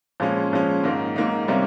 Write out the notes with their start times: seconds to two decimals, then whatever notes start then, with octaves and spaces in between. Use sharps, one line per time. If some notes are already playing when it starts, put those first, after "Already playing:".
0.20 A#2 F3 G#3 C#4
0.52 A#2 F3 G#3 C#4
0.84 G#2 D#3 A#3 D#4
1.16 G#2 D#3 A#3 D#4
1.48 C3 G3 A#3 C#4